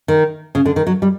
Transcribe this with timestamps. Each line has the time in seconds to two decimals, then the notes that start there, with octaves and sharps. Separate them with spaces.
0.08 D#3
0.55 C#3
0.66 D3
0.76 D#3
0.87 F#3
1.02 G3